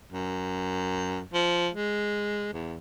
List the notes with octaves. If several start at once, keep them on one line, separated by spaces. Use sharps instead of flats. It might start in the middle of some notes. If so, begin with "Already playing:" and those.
F#2
F3
G#3
E2